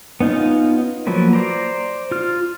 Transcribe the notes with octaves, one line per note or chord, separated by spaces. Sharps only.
B3 C#4 D#4 F4 F5
F3 F#3 A#3 B4
C5 D5 A#5
F4 F6